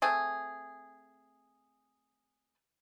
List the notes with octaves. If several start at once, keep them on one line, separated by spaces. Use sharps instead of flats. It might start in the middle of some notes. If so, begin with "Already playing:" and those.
A3 C4 G#4